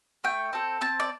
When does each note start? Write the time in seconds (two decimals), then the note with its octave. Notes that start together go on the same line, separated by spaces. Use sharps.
0.24 A3 G5
0.53 C4 A4
0.81 C4 A5
1.00 D5